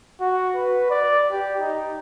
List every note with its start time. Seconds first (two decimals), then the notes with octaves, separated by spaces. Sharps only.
0.21 F#4
0.56 B4
0.90 D5
1.31 G4
1.60 D#4